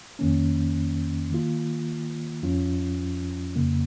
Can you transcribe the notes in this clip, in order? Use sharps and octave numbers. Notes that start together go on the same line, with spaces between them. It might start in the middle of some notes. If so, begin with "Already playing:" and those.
F2 D#3 A#3 C#4
D#3 A#3 F4
F2 F3 C#4 F4
F2 C#3 A#3